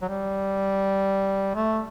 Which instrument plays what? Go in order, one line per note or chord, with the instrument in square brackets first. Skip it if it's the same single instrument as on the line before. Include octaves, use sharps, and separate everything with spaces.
[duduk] F#3
G3
A3